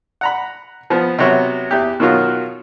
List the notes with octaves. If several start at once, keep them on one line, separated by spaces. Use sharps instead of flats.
F#5 A#5 B5
F3 B3
C3 F#3 B3
E2 G4
B2 D#3 F#3 F4 F#4